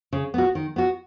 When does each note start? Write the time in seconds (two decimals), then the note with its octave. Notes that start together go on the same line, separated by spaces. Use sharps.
0.13 C#3
0.34 B3 F#4
0.55 D#3
0.76 B3 F#4